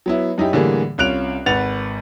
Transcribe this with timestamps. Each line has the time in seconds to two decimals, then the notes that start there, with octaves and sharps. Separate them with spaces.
0.06 F#3 B3 E4
0.38 F#2 D#4 E4 G4
0.52 A2 D3 E3 G3 A#3 G#4
0.98 C2 C#4 F4 F#6 D7 F7
1.46 G#1 B4 F#5 A6 F7